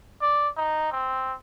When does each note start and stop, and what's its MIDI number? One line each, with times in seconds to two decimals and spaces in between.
0.22 0.49 74
0.57 0.90 63
0.92 1.34 60